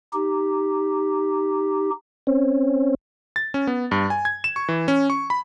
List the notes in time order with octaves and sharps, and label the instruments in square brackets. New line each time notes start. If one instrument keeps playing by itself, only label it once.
[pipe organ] D#4 G4
[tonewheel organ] C4 C#4
[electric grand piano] A6
C#4
B3
G2
G#5
G#6
E7
C#6
E3
C#4
C#6
B5